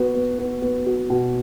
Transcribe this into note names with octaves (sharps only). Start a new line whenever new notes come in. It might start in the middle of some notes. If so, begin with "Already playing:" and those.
Already playing: B3 F#4
B3
B3
B3
F#4
B2